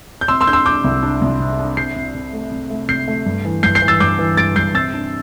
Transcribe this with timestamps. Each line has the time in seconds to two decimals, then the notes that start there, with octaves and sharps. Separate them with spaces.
0.21 G6
0.28 C3 C6 E6
0.41 C6 E6
0.47 D4 G6
0.53 C6 E6
0.66 D4 D6 G6
0.84 C2
1.03 D4
1.22 C2
1.40 C3
1.59 D4
1.77 C3 G6 C7
1.96 C3
2.14 C3
2.33 A3
2.51 C3
2.70 A3
2.89 C3 G6 C7
3.08 A3
3.26 G2
3.45 E3
3.63 G2 G6 C7
3.75 G6 C7
3.82 E3
3.88 E6 A6
4.00 G2 D6 G6
4.19 E3
4.37 G2 A6 D7
4.56 G2 G6 C7
4.75 C3 E6 A6
4.94 D4